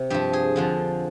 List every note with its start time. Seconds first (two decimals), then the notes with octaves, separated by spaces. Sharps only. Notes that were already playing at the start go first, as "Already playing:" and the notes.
Already playing: C3
0.10 G2 F3 G4
0.33 G#4
0.56 F2 D3 F3